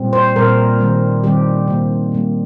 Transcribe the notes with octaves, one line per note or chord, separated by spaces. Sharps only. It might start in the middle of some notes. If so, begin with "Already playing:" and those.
Already playing: A#2 G3 C4
C5
A#2 G3 C4 A#4
D#3 G3 C4
D#3 G3 C4 G4
C3 G3 A#3
C3 G3 A#3